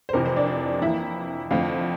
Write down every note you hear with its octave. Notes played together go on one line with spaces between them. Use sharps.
C5
F1 F2 C3 E3 A#4
C5
D4 D5
F2 E3 A#3 E4 E5
F2 D3 A3 C4 F4 F5